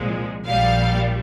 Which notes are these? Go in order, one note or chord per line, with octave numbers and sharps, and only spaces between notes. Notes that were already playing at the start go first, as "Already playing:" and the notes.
Already playing: C2 A#2 F3 G#3
A#1 A#2 G3 F5